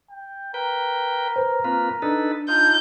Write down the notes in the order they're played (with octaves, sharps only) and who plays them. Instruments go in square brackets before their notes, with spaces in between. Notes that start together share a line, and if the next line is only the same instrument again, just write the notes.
[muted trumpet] G5
[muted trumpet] A#4 [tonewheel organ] B4 G5
[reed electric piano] B4 C5
[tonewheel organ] A#3 F4 B4 [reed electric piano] C4
[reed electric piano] D4 [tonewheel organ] D#4 A4 B4
[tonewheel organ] D#4 F4 [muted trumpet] A5 [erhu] G6